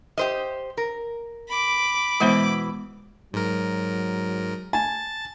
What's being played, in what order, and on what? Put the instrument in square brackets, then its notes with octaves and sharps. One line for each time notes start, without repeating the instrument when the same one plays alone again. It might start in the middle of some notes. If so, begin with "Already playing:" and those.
[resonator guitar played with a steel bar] G4 C5 D#5
A#4
[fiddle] B5 D6
[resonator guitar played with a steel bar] B2 E3 [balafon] G#3 B3 C5
[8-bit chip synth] G#2 A#4 [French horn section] F#3
[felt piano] G#5 [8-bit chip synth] A5 A6